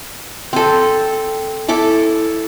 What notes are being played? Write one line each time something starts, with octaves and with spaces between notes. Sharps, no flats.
C4 A4
E4 A4 D6